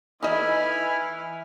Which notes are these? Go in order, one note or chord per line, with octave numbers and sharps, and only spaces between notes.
E3 D#4 E4 A4 D#5 G#5 B5 F6